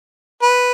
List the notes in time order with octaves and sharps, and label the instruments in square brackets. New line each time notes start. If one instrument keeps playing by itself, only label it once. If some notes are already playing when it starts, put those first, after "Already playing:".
[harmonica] B4